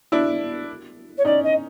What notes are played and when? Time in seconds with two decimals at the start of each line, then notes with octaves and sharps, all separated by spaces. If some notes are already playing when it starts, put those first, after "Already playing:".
0.12 D4 E4
1.17 C#5
1.25 C#4 D#4 D5
1.43 D#5